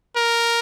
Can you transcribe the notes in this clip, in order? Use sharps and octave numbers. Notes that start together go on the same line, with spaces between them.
A#4